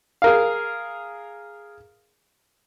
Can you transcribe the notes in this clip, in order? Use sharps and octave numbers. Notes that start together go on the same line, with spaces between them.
G#4 A#4 F5